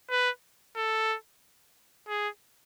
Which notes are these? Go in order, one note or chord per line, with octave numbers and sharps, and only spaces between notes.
B4
A4
G#4